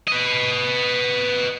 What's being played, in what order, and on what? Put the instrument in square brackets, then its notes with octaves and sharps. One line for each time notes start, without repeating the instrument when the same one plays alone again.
[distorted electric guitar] B4 D#5